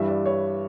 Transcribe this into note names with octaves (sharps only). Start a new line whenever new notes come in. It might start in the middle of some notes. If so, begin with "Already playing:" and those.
Already playing: G2 E3 G3 E5
D5
C#5